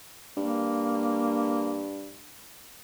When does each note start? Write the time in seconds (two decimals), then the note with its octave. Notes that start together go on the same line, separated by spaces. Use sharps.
0.37 G2 A#3